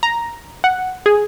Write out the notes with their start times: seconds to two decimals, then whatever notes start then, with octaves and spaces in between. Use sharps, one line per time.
0.03 A#5
0.64 F#5
1.06 G#4